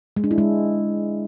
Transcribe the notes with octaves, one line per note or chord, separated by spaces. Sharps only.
G#3
D4
E4
G#3